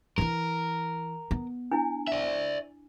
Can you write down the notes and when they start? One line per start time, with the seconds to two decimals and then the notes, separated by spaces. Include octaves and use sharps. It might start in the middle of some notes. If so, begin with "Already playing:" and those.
0.18 E3 E4 A#4
1.31 B3
1.71 D4 E4 G#5
2.07 D5 E5